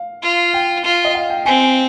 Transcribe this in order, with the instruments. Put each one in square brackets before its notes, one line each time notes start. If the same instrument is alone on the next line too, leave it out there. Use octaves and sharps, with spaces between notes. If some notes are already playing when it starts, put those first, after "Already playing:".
Already playing: [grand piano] F5
[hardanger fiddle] F4
[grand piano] G5
[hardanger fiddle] F4
[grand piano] D#5
F5
G5
[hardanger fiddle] C4 [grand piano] G#5